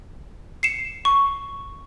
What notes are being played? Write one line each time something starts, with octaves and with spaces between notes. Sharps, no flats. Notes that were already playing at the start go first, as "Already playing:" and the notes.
C7 C#7 E7
C#6